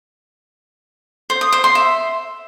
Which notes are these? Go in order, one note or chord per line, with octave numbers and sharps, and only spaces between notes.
C5
D#6
C5
C6
E5